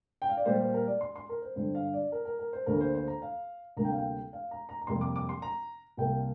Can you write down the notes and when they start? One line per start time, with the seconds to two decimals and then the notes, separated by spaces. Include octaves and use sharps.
0.22 G5
0.29 F5
0.37 D5
0.46 A#2 G3 A#3 C5
0.60 C5
0.74 A#4
0.87 D5
1.01 C6
1.16 C6
1.29 A#4
1.42 C5
1.56 G2 D3 G3 C5
1.75 F5
1.94 D5
2.12 A#4
2.25 A#4
2.39 A#4
2.53 C5
2.66 D2 D3 A#3 A#4
2.81 C5
2.95 C5
3.08 A#5
3.22 F5
3.77 D2 C3 G3 A#3 A#5
3.85 G5
3.92 F5
3.98 G5
4.33 F5
4.51 A#5
4.69 A#5
4.82 A#5
4.87 F2 C3 G3 A#3 C6
5.01 D6
5.16 D6
5.29 C6
5.42 A#5
5.97 C2 C3 G3 A#3 G5